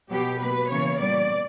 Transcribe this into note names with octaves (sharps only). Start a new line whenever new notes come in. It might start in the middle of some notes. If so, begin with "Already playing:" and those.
B2 F#3 B3 G4
B2 A#3 B4
C#3 E3 A#3 C#5
A#2 G3 B3 D5